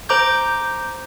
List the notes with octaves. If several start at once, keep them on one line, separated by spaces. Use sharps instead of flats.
C5 A#5 D6 G6